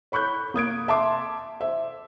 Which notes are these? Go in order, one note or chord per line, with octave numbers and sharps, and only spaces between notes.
C#5 B5 C#6 F#6 G6
A#3 D#6 G#6 D7
E5 A5 C6 D6
C5 E5